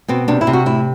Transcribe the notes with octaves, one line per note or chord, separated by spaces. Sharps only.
B2 C4
C3 D4
E4
C3
F#4
A2 E4